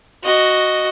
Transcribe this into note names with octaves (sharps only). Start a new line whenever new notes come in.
F#4 D#5